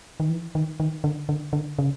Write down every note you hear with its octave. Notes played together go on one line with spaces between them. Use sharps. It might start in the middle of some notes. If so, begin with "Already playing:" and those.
D#3
E3
D#3
D#3
D3
D3
D3
C#3